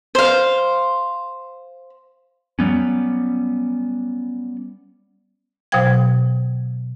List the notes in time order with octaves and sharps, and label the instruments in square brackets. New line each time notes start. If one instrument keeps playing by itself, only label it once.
[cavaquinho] C5 F5
[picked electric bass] F#3 G3 B3 C#4
[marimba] B2 F#3 C5 F5 G5 G#6